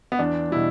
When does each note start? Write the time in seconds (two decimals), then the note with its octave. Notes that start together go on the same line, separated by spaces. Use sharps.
0.12 B3
0.19 E2 D4
0.51 B2 G3 E4